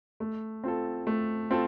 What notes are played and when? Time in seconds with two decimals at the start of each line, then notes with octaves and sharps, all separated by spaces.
0.20 A3
0.64 C4 F4 A4
1.07 A3
1.51 C4 F4 A4